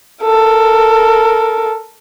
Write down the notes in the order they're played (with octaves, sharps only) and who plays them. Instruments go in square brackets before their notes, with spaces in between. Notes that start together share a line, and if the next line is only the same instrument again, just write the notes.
[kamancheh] A4 A#4